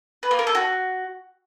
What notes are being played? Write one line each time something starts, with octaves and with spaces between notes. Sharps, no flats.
B4
A#3
A#4
A4
F#4